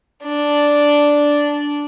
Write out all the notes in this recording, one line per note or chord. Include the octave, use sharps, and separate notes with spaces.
D4